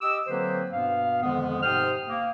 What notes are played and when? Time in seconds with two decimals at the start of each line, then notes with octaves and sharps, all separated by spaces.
0.01 G4 D#5 D6 E6
0.27 D3 F#3 A#3 C4 B4 C5
0.72 G2 B2 B3 F5
1.22 F2 D3 D#3 F3 G#3 B3
1.63 G#2 C3 C5 G5 D#6 F6
2.08 A#3